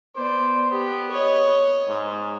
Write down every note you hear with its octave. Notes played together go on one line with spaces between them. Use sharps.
B3 C5 D5
B3 G4
C#5 D#5
G#2